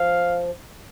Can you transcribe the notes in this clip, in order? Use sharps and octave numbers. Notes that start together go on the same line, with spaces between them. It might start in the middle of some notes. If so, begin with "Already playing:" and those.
Already playing: F3 F5